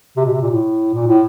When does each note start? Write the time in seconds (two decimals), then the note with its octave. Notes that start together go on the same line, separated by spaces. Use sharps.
0.17 C3
0.25 B2
0.33 C3
0.42 A#2
0.51 A2
0.94 A#2
1.07 A2